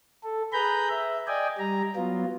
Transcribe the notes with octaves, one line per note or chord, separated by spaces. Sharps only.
A4
G#4 B4 A#5 B5 G6
E5
D5 D#5 G5 G#5
G3 A#5
F#3 B3 F4